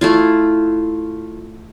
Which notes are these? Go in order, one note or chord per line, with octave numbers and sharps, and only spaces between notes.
A3 E4 F4